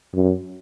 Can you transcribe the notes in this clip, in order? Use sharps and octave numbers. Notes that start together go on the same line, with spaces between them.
F#2